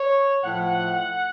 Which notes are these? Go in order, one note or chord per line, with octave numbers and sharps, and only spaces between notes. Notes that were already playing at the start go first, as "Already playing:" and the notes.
Already playing: C#5
A2 F3 F#5